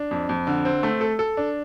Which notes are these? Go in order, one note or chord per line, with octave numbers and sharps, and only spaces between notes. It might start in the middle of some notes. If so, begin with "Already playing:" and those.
Already playing: D4
F2
F2
D3
C4
A3
A4
A4
D4